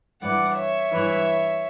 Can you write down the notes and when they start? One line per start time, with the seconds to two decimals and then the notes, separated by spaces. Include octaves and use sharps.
0.21 G2 E3 D5 F#5
0.56 C#5 E5
0.91 G2 E3